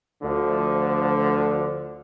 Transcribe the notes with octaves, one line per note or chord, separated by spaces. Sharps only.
D2 D3 F3